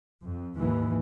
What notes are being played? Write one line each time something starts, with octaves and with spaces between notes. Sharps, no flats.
F2
D#2 G#2 E3